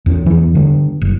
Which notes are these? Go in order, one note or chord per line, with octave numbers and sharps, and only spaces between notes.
E2 C#4
E2 E3
D3 G3
F#1